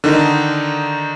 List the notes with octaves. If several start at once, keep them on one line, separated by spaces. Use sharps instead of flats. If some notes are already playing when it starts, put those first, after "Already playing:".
D3 D#3 D#4